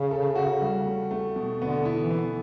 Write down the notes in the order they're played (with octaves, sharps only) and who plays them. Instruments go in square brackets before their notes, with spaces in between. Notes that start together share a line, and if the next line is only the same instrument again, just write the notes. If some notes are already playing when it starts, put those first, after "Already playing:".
Already playing: [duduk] C#3
[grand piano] A4
F#4
G3
A3
A3
B2
[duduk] D3 [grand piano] B3
[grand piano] E4
[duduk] E3
[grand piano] B3